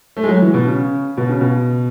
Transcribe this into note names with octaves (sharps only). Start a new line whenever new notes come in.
A3
G#3
F#3
E3
B2
C#3
B2
C#3
B2